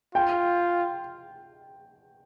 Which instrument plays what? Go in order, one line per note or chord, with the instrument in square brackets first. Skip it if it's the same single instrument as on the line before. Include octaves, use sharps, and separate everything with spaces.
[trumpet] F4 [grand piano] G5